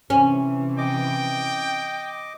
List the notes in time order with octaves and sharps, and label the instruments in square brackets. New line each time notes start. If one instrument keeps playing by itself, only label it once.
[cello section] C3 E3 [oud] C#4
[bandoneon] D#5 D6 [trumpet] G5